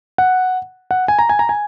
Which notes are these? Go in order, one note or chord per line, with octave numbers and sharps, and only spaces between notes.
F#5
F#5
G#5
A#5
G#5
A#5
G#5